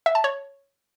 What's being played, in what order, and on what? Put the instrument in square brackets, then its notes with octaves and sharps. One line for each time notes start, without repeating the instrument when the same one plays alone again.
[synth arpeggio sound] E5
A5
C#5